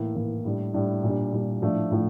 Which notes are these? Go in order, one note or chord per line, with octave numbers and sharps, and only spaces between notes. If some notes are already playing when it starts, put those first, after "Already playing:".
Already playing: A2 E3 A#3 E4
A2 E3 A#3 E4
A2 G3 D4
A2 G3 D4
A#2 G3 D4
A#2 G3 D4
A2 F3 A3 D4
A2 F3 A3 D4